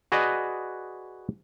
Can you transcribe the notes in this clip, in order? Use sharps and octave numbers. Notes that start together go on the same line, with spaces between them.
F#4 G#4 B4 D5 D#5